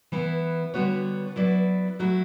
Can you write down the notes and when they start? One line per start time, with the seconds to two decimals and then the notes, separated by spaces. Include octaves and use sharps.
0.12 E3 B3 E4
0.74 D3 G3 B3 F#4 C#5
1.36 F#3 B3 E4 B4 D5
1.99 F#3 A3 E4